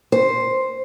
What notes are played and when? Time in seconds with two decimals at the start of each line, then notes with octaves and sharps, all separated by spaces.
0.12 C5